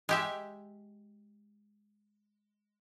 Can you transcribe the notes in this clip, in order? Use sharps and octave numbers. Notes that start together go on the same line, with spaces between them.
G#3 G4 E5